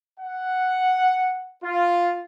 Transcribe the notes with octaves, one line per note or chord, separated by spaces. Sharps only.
F#5
F4